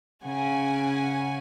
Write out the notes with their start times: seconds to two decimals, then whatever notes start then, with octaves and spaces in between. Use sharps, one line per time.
0.24 C#3 F#5 G#5